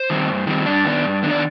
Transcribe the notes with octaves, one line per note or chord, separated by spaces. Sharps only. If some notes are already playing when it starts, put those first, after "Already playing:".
Already playing: C5
D#3 G3 C4
G2
D#3 G3 C4
G2 D4 D5
D#3 B3 D4
G2
D#3 B3 D4
D5